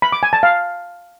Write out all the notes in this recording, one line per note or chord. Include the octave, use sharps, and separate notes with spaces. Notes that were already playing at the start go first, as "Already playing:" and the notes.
B5
D6
G#5
A5
F5